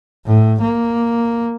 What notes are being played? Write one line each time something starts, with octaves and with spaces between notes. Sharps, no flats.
A2
A#3